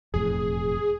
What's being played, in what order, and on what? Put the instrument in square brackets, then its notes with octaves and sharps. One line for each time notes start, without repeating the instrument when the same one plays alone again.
[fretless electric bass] E1 F2 A2 [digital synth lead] G#4